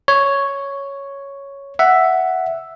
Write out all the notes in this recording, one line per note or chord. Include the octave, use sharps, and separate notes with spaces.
C#5
E5 F#5